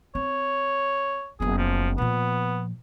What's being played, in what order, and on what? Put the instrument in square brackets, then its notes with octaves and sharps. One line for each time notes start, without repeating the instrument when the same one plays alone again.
[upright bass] C4 [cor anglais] C#5
[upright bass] F#1 B3 [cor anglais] G#4
[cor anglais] F3
[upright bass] A#2 F3 [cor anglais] B3